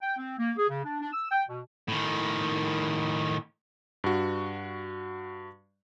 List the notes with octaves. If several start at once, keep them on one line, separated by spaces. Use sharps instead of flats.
G5
C4
A#3
G#4
C#3
D4
D4
E6
G5
B2
A2 D#3
G2 F#4